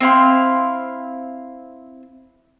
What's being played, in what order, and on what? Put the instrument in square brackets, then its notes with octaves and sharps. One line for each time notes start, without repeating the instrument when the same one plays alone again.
[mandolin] C4 E4 F5 C6